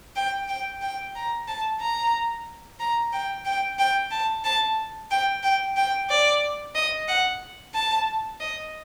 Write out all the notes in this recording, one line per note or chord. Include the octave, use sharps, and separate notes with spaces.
G5
G5
G5
A#5
A5
A#5
A#5
G5
G5
G5
A5
A5
G5
G5
G5
D5
D#5
F#5
A5
D#5